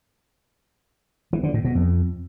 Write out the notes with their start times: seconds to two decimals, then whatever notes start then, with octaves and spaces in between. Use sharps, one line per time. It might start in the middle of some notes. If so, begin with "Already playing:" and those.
1.33 E3
1.43 D3
1.54 A2
1.64 B2
1.75 F2